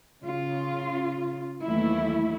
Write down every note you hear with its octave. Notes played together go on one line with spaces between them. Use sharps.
C#3 F4
D#2 E3 F#3 A3 E4